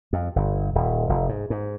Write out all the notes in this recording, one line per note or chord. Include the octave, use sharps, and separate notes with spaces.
F2
G1
D#1
F1
G#2
G#2